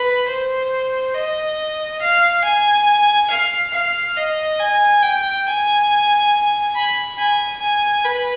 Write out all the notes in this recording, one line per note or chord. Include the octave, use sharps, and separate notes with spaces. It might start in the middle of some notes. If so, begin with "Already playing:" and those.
Already playing: B4
C5
D#5
F5
G#5
F5
F5
D#5
G#5
G5
G#5
B5
G#5
G#5
B4